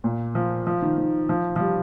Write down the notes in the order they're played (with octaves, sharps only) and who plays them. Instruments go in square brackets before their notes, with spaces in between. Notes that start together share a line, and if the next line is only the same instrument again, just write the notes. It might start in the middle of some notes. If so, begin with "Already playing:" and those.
[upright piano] A#2
F3
F3
D#3
D#3
F3
F3
G3